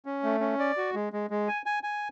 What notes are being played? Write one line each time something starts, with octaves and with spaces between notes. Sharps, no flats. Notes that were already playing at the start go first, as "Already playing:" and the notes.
C#4
A3
C#4
D5
F#4
G#3
G#3
G#3
G#5
G#5
G#5